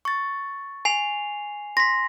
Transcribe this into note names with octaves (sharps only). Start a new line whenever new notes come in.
C#6 A6
G#5 C7 F7
C6 A#6 B6